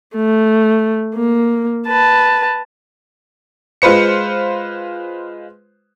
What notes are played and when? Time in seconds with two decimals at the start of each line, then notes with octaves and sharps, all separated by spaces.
0.16 A3
1.16 A#3
1.88 B4 A5
3.82 G#3 F4 B4 C5 C#7